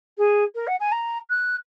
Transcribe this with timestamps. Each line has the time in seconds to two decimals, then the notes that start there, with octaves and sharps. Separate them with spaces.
0.18 G#4
0.55 A#4
0.67 F#5
0.80 G#5
0.92 A#5
1.30 F#6